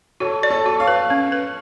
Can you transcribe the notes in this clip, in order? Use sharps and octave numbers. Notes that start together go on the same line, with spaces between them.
F#4 A4 C#5
D5
A4 C#5
F#4
C#5 F5
B4
C#4
B4